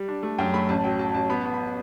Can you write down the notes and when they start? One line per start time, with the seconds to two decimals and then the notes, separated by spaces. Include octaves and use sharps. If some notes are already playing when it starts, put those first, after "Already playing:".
Already playing: G3
0.08 D4
0.23 A3
0.38 F#2 G5
0.54 A3 B5
0.69 A1 A5
0.84 F#3 G5
0.99 F#3 A5
1.14 A1 A5
1.30 B3 B5
1.41 B3 A5
1.54 B5